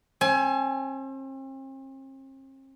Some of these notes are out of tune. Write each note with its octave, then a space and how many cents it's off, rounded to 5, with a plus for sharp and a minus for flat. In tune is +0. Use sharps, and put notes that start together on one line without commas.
C4 +45 G#5 +25